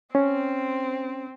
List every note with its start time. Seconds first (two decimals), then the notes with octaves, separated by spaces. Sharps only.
0.15 C4 C#4